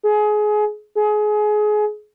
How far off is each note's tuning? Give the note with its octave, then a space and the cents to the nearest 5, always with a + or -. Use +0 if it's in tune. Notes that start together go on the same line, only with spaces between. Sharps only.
G#4 +25
G#4 +25